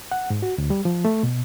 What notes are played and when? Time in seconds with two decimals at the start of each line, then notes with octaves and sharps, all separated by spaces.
0.11 F#5
0.30 G#2
0.42 F#4
0.58 D2
0.70 G3
0.85 F3
1.05 A3
1.23 B2